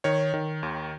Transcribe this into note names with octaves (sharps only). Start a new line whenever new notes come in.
D#3 C#5
D#3
D#2